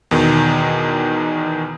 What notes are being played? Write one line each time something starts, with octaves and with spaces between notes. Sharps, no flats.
E2 B2 D#3